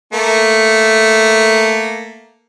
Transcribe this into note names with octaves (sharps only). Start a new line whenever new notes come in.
A3 A#3